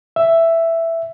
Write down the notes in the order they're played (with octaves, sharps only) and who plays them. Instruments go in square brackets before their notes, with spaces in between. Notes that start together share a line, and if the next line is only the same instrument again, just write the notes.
[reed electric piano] E5